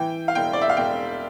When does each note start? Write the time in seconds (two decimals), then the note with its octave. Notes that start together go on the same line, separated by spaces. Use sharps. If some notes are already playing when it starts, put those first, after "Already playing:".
Already playing: E3 G5
0.28 F5
0.35 E1 G5
0.53 D5
0.61 E5
0.69 F5
0.77 E1 G5